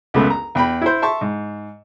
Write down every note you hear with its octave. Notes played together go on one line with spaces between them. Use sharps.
C#2 F#2 A3 B3
A#5
E2 G5 B5
E4 C5
E5 A5 C6 C#6
G#2